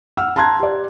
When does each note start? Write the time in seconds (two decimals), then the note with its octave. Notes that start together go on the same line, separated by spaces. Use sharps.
0.17 F#5 E6 F6
0.36 A5 A#5 C6 F#6 G#6
0.60 G4 D5